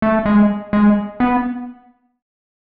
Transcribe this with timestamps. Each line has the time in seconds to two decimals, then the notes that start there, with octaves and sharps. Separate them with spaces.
0.02 A3
0.26 G#3
0.73 G#3
1.20 B3